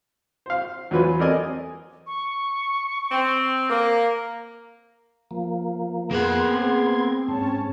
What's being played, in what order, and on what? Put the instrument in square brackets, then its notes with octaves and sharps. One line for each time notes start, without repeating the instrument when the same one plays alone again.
[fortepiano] C5 F5
E2 F#3 F4 B4 C5 G#5
C4 A4 A#4 D5 D#5 G#5
[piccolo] C#6
[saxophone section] C4
[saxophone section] A#3 [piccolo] D6
[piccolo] A#5
[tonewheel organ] F3 A#3
[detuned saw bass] F2 [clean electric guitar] A#3 A#4 F#5 [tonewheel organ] B3 G#6 [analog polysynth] G#4 C6
[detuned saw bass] C4
[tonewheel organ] G#2 [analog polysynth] C#4 C#5 A5